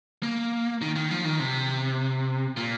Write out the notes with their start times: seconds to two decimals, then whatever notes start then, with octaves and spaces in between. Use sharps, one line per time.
0.23 A#3
0.81 D#3
0.96 D#3
1.11 F3
1.25 D#3
1.40 C3
2.57 A#2